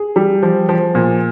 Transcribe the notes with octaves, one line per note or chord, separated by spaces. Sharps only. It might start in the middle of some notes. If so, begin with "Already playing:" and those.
Already playing: G#4
G3
F3
F3
A#2